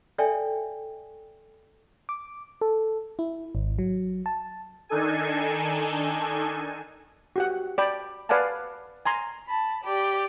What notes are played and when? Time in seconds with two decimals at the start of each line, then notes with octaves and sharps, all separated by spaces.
0.18 A4 C#5 D5 E5 G5 G#5
2.09 D6
2.61 A4
3.19 E4
3.55 G#1
3.79 F#3
4.26 A5
4.89 D#3 D4 D#4 A4 G#5
7.36 F#4 G4 F#5
7.78 D5 G5 B5
8.29 B4 D5 F5 F#5 G#5 A5
9.06 G#5 A#5 C6
9.45 A5 B5
9.84 G4 D5